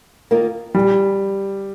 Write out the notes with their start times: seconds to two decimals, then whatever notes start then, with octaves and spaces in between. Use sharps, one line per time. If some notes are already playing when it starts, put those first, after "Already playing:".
0.31 D#3 A#3 F4 A#4
0.75 A#2 G3